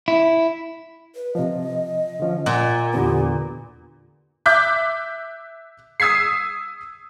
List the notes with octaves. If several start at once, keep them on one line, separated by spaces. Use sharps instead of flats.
E4
B4
C3 F3 D#5
D3 F3 C#4
A#2 F#5
E2 D3 B3 G4
E5 D6 F#6 G6 B6
D#6 E6 G#6 B6 C7